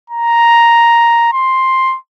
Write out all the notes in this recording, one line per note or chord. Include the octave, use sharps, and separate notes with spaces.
A#5
C6